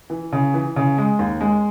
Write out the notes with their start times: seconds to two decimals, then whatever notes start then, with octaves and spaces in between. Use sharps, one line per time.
0.10 E3
0.32 C#3
0.54 E3
0.76 C#3
0.98 G#3
1.19 D#2
1.41 G#3